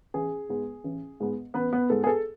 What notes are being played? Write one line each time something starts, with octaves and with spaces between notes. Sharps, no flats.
A1 G#4
G#2 G#3 B3
A1
G#2 G#3 B3
A1 B3 B4
B3 B4
G#2 G#3 B3 A4
G#4
A4